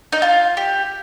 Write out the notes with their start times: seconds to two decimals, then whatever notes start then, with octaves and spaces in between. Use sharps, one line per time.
0.12 D#4
0.22 F4
0.57 G4